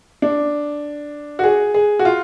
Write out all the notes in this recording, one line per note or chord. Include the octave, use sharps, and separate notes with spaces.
D4
F#4
G#4
G#4
F#4
F4